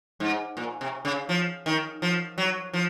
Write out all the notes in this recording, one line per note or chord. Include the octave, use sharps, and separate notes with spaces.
G#2
A#2
C3
C#3
F3
D#3
F3
F#3
F3